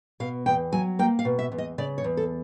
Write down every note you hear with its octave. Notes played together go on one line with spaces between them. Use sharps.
B2 F5
E2 G5
F#3 G#5
A#3 G5
F5
B2
E5
E2
D#5
C#3 D5
C#5
E2
A4